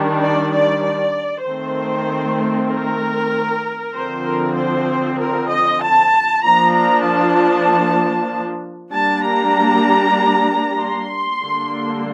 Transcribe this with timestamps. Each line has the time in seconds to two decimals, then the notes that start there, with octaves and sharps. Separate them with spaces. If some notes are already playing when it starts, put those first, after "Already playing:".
Already playing: D#3 G3 D4
0.21 D5
0.52 D5
0.83 D5
1.45 D#3 A3 C4 C5
2.71 A#4
3.94 D3 F3 C4 C5
4.25 A#4
4.56 C5
5.20 A#4
5.50 D#5
5.82 A5
6.44 F3 A#3 D4 A#5
6.75 A#5
7.06 A5
8.93 G3 A#3 D4 A5
9.25 A#5
10.80 C6
11.42 D3 G3 A#3 D4